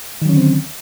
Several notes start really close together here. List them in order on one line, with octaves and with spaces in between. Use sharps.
D#3 F#3 C#4 D3 C4